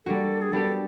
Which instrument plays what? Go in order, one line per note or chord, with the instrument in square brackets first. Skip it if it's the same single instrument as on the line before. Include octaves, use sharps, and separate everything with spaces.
[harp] G3 A#3 D4 F#4 [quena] A4
[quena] G#4
[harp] G3 B3 D4 G4 [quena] A4